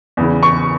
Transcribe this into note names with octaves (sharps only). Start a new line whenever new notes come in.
E2 C#3 E3
C#6